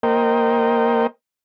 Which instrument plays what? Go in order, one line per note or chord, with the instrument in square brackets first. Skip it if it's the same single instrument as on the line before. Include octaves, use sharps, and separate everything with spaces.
[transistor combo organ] A#3 A#4 C5 D#5 G5